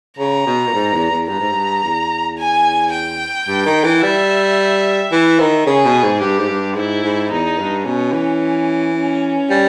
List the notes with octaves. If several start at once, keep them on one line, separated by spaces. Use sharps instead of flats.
C#3 A#5
B2
A#2
G#2
E2
E2
G2 A#5
G#2
G2
E2
G#5
G5
G2
D#3
E3
G3 E5
E3
D#3
C#3 G#4
B2
G#2
G2 G4
G#2
G2
G#2 E4
G#2
E2 D#4
G2
B2 C#4
E3
C#4
G3